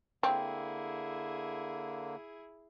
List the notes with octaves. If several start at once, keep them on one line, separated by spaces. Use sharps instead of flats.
D3 A#3 C4 E4 G#4